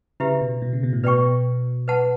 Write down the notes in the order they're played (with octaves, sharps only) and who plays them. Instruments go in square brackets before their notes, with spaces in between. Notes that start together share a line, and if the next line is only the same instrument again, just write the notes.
[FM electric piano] C#3 [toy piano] E4 G4 B4 E5
[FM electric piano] B2
B2
C#3
B2
A2
[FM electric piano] B2 [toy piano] B4 D5 G5 C#6
[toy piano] B4 F#5 A5